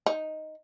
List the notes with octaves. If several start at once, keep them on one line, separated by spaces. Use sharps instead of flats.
D#4